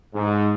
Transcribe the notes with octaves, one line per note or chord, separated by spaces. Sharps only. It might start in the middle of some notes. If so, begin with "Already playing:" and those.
G#2